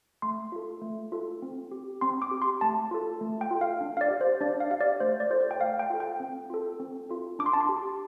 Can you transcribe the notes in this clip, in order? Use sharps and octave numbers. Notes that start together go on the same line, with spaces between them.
A3 C6
F4 A4
A3
F4 A4
C4
G4
C4 C6
D6
G4
C6
A3 A5
F4 A4
A3
G5
F4 A4
F5
D4
F5
D5
G4
C5
D4 D5
F5
G4 F5
D5
A3 C5
D5
F4 A4 C5
D5
G5
A3 F5
G5
F4 A4
G5
C4
F4 A4
C4
F4 A4
D4 D6
C6
A5
C6
G4